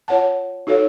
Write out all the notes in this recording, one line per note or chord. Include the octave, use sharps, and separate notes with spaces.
F4 C#5 F#5 A5
D#4 F#4 A4 C#5 F5